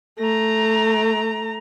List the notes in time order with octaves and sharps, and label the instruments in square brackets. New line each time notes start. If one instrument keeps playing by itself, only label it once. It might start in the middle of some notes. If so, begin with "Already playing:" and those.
[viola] A3 A#5